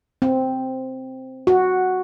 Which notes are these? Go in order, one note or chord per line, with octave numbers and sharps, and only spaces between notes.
C4
F#4